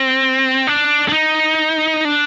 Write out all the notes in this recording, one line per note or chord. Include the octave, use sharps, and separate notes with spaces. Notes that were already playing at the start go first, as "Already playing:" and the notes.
Already playing: C4
D4
D4
D#4
D4